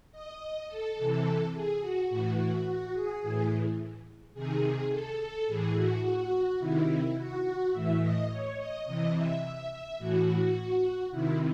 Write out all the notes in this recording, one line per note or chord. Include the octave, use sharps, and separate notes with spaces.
D#5
A4
C3 E3
G#4
F#4
A2 E3 F#4
F#4
F#4
G#4
A2 E3 G#4
C3 D#3 G#4
A4
A4
A2 E3 G#4
F#4
F#4
C3 D#3 E4
F#4
A2 E3 E5
D#5
C#5
D#5
C3 E3 D#5
E5
E5
E5
A2 E3 F#4
C3 D#3 E4